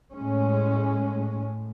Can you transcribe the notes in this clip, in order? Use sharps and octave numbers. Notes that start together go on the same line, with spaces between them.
A2 G#3 C#4
A2